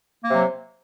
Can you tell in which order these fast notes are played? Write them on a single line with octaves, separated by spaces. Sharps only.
A#3 C3 F#3